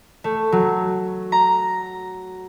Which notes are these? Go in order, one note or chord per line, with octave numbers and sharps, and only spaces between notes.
A3
F#3
A#5